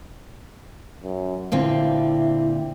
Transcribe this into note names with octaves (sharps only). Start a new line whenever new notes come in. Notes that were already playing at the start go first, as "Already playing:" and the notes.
F#2
A#2 D3 C4 E4